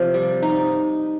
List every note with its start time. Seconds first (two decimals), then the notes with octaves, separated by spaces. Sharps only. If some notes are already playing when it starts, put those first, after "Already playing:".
Already playing: C3 F3
0.14 G3
0.42 D#4